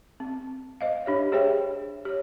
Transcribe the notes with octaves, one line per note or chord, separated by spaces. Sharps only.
C4
C5 D#5 F5
D4 G4 C#5 E5
G4 G#4 C5 C#5 E5 G5
G4 C#5